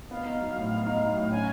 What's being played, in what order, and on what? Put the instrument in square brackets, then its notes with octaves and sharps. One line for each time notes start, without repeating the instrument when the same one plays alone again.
[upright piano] B3 [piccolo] F5
[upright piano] D#4
F#3
A2
B3
D#4
F#3
A2
[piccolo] G5
[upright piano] C#4 [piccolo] G#5